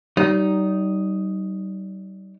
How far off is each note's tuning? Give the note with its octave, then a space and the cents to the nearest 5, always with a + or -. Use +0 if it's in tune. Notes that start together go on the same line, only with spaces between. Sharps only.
G3 -35 D#4 +0